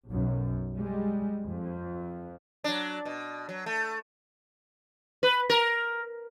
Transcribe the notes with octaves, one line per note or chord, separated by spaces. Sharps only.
B1 F#2
G3 G#3
F2
F#3 D4
B2
F#3
A3
B4
A#4